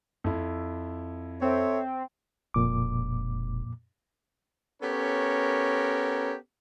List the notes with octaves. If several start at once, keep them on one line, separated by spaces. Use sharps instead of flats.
F2 E4
C4 A4 C#5 E5
E1 F2 A#2 D6
B3 C#4 G4 A4 A#4 C#5